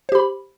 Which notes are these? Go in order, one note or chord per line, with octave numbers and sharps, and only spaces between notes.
G4 C5 B5